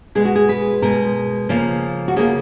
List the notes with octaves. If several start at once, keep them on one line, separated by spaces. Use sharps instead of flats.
B2 G#3 G#4
F#4
G#4
B4
B2 G#3 A#4
C#3 F3 A#3
F#4
C#3 F3 A#3 G#4